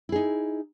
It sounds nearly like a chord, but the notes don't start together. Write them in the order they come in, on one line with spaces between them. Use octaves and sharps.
E4 G#4 D#4